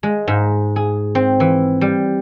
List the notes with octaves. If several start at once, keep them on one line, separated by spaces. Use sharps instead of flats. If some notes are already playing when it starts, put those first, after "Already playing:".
G#3
G#2
G#4
C4
E3
G3